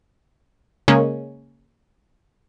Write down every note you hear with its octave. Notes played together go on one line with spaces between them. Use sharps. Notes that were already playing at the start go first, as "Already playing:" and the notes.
C#3 G#3 A#3 C#4